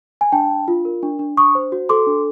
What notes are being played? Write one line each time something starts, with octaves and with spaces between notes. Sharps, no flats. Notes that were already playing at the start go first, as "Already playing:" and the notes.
G#5
D4 G5 A5
D4
F4
A#4
D4
D4
D4 C#6 D#6
C5
F#4
A4 C6 D6
D4